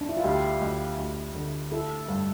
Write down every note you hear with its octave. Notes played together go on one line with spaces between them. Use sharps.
D4
E4
F4
D2 G4
D2
D2
D3
E4 A4
G2